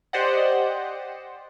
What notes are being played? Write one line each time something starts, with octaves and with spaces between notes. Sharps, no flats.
G4 C5 D5 D#5 F#5